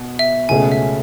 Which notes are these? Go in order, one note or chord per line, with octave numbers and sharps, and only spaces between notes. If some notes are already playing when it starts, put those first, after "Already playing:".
Already playing: B2
E5
C#2 B2 A3 C#4 G#4 G#5
E5